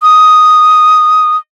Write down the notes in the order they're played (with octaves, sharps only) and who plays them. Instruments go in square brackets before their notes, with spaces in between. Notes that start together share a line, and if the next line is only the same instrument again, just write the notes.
[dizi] D#6